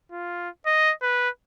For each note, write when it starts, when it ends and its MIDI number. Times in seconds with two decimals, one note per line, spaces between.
0.12 0.49 65
0.66 0.93 75
1.02 1.29 71